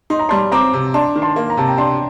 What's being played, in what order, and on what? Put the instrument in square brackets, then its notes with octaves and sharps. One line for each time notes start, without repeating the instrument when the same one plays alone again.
[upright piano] D#4 [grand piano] C6
[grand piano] A#5
[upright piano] G3 [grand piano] A5 C6
[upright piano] C4 [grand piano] A#5 D6
[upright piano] C3
[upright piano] D4 [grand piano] A5 C6
[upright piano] D#3
[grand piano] A5 C6
[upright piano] A#3
[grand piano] A#5
[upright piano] C3 [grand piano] A5
[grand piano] G5 A#5
[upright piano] D4 [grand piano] A5 C6